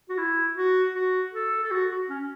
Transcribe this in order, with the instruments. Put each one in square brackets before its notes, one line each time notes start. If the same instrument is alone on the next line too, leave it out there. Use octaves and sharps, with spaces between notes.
[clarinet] F#4
E4
F#4
F#4
A4
A4
F#4
F#4
C#4